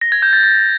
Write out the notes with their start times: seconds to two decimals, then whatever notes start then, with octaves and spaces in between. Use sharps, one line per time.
0.01 A#6
0.12 G#6
0.22 G6
0.33 A6
0.43 A6